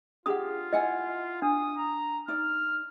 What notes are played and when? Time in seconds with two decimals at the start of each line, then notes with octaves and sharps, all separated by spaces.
0.26 D4 F4 G4 G#4 F#5 D#6
0.73 E4 D#5 F#5 G#5
1.42 D4 D#6
1.77 A#5
2.28 D#4 D5 F6